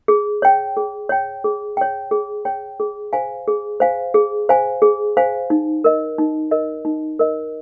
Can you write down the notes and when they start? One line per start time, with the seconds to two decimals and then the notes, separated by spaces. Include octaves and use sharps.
0.08 G#4
0.42 C#5 G5
0.77 G#4
1.09 C#5 G5
1.44 G#4
1.77 C#5 G5
2.11 G#4
2.45 C#5 G5
2.80 G#4
3.13 C5 F5 G#5
3.48 G#4
3.80 C5 F5 G#5
4.14 G#4
4.49 C5 F5 G#5
4.82 G#4
5.17 C5 F5 G#5
5.50 D#4
5.84 A#4 D#5
6.19 D#4
6.51 A#4 D#5
6.85 D#4
7.19 A#4 D#5